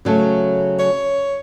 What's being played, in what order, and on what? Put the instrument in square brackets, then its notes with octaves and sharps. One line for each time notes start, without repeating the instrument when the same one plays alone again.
[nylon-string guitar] C#3 F#3 A3
[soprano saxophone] C#5